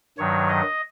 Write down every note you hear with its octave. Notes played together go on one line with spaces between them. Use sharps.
G2 D#3 F#3 C#5
D#5